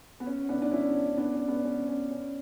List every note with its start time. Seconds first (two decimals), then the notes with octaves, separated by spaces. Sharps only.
0.20 B3
0.26 C#4
0.49 B3 D4
0.62 D4
0.72 C#4 E4
1.17 B3 D4
1.33 C#4
1.48 B3
1.64 C#4
1.88 C#4
2.10 C#4